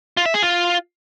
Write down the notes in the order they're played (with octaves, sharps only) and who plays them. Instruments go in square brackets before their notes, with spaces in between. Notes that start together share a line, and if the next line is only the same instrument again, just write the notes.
[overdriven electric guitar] F4
E5
G#4
F4